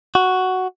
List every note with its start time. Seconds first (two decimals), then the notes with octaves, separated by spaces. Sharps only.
0.15 F#4